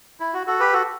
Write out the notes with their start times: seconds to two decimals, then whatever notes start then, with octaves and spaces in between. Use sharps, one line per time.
0.20 E4
0.34 F#4
0.47 F#4 A4
0.60 G4 B4
0.73 F#4 A4